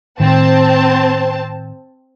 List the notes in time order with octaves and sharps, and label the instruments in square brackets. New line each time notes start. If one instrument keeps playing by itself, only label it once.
[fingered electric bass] A2 D#3 [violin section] C4 A5